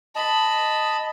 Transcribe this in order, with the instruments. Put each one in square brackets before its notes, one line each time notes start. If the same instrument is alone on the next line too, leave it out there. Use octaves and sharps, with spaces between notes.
[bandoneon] D#5 A5 [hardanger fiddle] B5